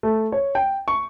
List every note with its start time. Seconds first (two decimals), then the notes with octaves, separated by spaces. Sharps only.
0.03 A3
0.32 C#5
0.55 G5
0.88 C#6